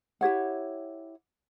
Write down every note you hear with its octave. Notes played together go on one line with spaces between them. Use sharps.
E4 G4 C#5 F#5